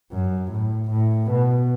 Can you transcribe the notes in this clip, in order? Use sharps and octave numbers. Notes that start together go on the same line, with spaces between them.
F#2
A2
A2
B2